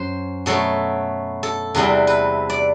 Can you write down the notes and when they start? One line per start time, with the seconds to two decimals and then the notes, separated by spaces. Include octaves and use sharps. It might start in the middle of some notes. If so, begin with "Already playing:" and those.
Already playing: F#2 F#3 C5
0.46 B2 F#3 A3 A4
1.43 A4
1.75 E2 C3 E3 G3
2.07 B4
2.50 D5